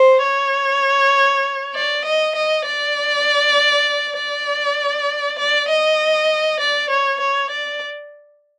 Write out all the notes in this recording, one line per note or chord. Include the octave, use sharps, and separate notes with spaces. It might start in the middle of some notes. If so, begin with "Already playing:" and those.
Already playing: C5
C#5
D5
D#5
D#5
D5
D5
D5
D#5
D5
C#5
C#5
D5